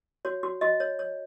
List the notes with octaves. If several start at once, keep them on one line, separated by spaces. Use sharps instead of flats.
F#4 C#5
F#4
F#4 D#5
C#5
C#5